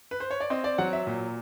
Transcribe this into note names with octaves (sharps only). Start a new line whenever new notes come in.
B4
C5
C#5
D5
C4 D#5
D5
F#3 F#5
E5
A#2